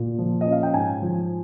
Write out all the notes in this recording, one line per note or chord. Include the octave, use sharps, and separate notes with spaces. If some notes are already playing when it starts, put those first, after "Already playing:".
Already playing: A#2
F3
D#5
C#4
F5
G5
G#2 G#5
F3